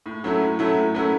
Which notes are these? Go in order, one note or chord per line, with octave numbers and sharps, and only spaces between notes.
A2
F#3 A3 C#4 E4
A2
F#3 A3 C#4 E4
A2
F#3 A3 C#4 E4